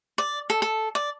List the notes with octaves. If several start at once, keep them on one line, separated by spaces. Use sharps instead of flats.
D5
A4
A4
D5